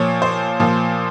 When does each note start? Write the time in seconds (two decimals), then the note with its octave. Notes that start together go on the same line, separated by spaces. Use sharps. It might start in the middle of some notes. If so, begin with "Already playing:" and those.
Already playing: A#2 F3 C#5
0.22 C5
0.60 A#2 F3